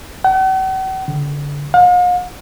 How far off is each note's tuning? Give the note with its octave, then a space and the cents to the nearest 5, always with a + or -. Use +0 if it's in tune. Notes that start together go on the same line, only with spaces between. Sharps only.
F#5 +45
D3 -30
F5 +45